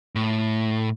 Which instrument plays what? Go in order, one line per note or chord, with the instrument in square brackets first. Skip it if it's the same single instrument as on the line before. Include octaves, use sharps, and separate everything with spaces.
[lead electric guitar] A2